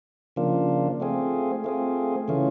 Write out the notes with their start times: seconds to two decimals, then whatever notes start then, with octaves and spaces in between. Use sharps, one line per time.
0.36 C#3 F3 A#3 D4 F4
1.00 A3 C4 F4 G#4
1.64 A3 C4 F4 G#4
2.28 C#3 E3 A3 C#4 F4